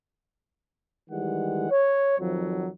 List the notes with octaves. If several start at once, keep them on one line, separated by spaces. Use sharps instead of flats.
D#3 E3 G3 G#3 F#5
C#5
F2 D#3 F3 F#3